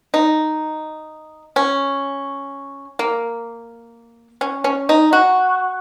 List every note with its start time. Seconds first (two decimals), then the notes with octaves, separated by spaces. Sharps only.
0.14 D#4
1.56 C#4
2.99 A#3
4.41 C#4
4.64 C#4
4.89 D#4
5.13 F#4